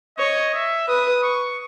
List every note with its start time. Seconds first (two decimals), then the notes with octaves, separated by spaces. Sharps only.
0.18 C#5 D#5
0.54 E5
0.88 B4 D#6
1.23 C#6